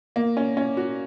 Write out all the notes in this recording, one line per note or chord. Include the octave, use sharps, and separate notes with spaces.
A#3
C#4
C#4
F#4